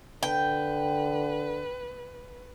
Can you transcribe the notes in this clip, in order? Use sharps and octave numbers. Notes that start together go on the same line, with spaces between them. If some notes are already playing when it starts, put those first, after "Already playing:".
D3 B4 G5